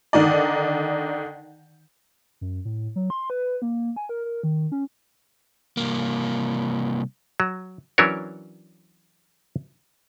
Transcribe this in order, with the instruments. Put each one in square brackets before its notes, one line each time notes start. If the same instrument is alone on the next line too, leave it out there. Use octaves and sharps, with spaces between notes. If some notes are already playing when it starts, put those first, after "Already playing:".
[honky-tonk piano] D3 D#3 D#4 D5
[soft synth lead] F#2
A2
F#3
C6
B4
A#3
G#5
A#4
A#4
D#3
C#4
[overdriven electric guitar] C2 A#3
[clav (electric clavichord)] F#3
E3 F#3 C#4 D4 A#4 C#5